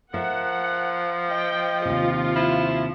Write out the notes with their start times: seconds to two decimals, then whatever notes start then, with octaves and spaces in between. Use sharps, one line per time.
0.14 F3 A#4 E5 F#5
1.31 D#5 G5
1.85 D#2 C3 F4
2.36 F3 E4